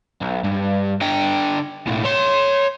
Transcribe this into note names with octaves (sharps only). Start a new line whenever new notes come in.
B1
G2
D3 G5
B1 A2
C#5 C6